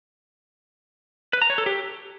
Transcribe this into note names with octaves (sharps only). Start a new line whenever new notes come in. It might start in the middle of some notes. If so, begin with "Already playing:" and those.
B4
A#5
C#5
A4
G4